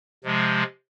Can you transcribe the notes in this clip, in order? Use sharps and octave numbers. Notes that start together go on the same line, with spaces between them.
C3 F3 G#3